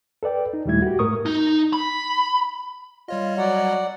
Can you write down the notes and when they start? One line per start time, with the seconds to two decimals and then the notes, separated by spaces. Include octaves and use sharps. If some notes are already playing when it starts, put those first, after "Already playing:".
0.23 A4 B4 D5 G5
0.53 D#4
0.65 D#2 A#2 G3 A3 E4 G#6
0.82 F#4 G4
0.99 G#2 A3 A#4 C#6 D#6
1.26 D#4
1.73 B5
3.08 G3 F4 C#5 D#5
3.38 F#3 D5 F#5